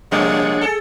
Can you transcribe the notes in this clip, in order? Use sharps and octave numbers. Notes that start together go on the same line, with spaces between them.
A#1 C3 G3 G#3 A#3 D4 C#5 F#5
G#4 A4